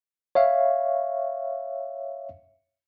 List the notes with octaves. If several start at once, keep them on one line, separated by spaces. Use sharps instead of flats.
C#5 E5 F5